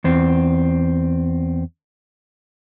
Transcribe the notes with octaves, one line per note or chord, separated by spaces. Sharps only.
E2 C4